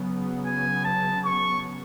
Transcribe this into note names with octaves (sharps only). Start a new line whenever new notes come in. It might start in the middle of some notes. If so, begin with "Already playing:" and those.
Already playing: C#3 F#3 B3
G#5
A5
C#6